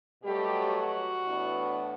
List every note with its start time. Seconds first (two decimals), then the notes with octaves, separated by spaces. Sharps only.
0.24 B2 F#3 G3 A3 G4
0.75 F#4
1.26 A2 E3 B3 D4